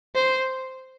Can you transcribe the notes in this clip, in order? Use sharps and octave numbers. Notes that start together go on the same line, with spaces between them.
C5